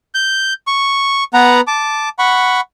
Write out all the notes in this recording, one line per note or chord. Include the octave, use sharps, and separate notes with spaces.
G6
C#6
B3 B4 F#5 A#5
A5 D6
F#5 B5 C#6